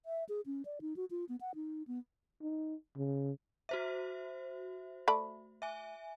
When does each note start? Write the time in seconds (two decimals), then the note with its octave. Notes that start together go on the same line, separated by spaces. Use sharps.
0.06 E5
0.29 G#4
0.46 C#4
0.65 D5
0.81 D#4
0.96 F#4
1.11 F4
1.29 B3
1.41 F#5
1.55 D#4
1.87 B3
2.42 D#4
2.97 C#3
3.69 F#4 C5 E5
5.08 A3 D5 B5
5.62 E5 G#5